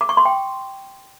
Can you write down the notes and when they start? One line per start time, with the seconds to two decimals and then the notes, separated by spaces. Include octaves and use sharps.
0.01 D6
0.09 C#6
0.17 C6
0.25 G5